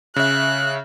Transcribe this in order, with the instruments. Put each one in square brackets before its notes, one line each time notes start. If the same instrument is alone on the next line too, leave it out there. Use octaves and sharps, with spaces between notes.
[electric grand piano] C#3 E5 [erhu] F#6